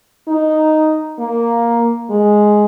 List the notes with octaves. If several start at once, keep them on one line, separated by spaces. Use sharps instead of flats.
D#4
A#3
G#3